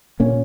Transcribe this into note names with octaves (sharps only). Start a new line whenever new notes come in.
A#2 A#3 C#4